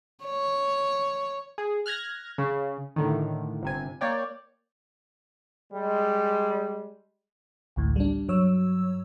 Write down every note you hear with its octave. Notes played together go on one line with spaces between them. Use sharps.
C#5
G#4
F6 F#6 G#6 A#6
C#3
A2 D3 D#3
G1 C3 G#5
A#3 C#5 D5 G5
G3 G#3
A1 D2 A2
G3 D4
G2 F#3 C#5 E6